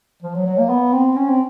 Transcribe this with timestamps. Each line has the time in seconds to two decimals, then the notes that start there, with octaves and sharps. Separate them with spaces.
0.23 F3
0.35 F#3
0.46 F#3
0.58 A#3
0.70 B3
0.93 C4
1.16 C#4
1.29 C4